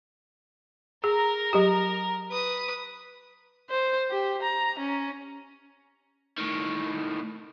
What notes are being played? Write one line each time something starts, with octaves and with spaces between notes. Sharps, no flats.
G#4 A#4 A#5
F#3 G4
B4 D#6
C5
G4
A#5
C#4
A2 D#3